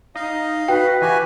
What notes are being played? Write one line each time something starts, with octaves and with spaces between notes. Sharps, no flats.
D#4 D#5 F5
F#4 B4 G5
E3 F#4 G4 G#5